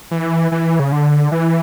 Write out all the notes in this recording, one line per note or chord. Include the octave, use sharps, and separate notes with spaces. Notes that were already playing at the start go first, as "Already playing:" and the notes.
E3
E3
C#3
D3
E3